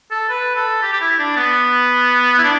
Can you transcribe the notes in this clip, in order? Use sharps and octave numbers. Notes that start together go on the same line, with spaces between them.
A4
B4
A4
G4
G4
E4
D4
B3
E4
D4